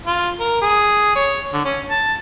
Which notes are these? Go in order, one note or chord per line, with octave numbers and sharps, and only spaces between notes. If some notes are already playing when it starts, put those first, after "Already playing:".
F4
A#4
G#4
C#5
D3
C#4
A5